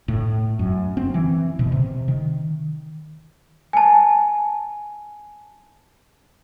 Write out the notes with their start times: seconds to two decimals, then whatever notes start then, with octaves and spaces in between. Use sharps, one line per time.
0.08 A2
0.59 F#2
0.97 C4
1.14 E3
1.59 B2
1.72 C3
2.08 D#3
3.73 G#5 A5